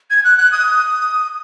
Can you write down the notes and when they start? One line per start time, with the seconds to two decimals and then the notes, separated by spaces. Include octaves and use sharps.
0.10 G#6
0.24 F#6
0.38 F#6
0.52 D#6